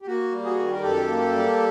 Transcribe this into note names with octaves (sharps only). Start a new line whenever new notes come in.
G4
A#3 F#4
G3
F#4 G#4
D#3
A#4
F#2 G4 A4
A#3
G3